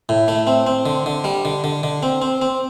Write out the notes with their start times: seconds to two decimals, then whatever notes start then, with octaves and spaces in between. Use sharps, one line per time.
0.09 A2
0.28 A3
0.47 C4
0.67 C4
0.86 D3
1.06 D3
1.24 G3
1.45 D3
1.64 D3
1.83 D3
2.03 C4
2.22 C4
2.42 C4